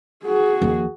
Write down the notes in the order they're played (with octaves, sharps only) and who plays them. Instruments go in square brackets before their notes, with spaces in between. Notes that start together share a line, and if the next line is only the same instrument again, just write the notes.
[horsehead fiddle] F#4 G#4
[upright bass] D#2 F3